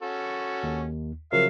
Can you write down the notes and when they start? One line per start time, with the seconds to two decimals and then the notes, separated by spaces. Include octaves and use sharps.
0.02 C#4 F#4 A4
0.63 D#2
1.33 C#3 F3 F#3 A#4 E5 F5